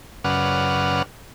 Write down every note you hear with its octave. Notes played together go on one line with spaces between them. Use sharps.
F#2 C#3 B4 D5 F#5 F6